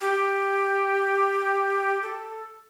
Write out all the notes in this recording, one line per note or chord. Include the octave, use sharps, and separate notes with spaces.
G4
A4